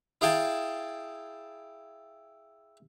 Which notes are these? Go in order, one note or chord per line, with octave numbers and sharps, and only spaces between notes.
E4 G#4 F5 G5 A5